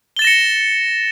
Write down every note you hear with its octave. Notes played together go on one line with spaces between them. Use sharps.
A6 A#6 C#7 E7 G7